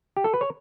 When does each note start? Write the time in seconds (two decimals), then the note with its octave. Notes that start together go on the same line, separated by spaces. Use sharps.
0.17 G4
0.24 A4
0.34 B4
0.41 C#5